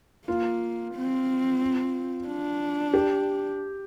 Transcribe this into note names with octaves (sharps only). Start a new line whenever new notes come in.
A#3 F4
C4
D4
G4